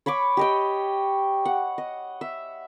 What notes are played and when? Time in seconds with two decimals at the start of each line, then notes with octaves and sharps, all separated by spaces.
0.06 C#5 B5 C#6 D6
0.37 G4 D#5 G5
1.45 F#5
1.78 D#5
2.21 E5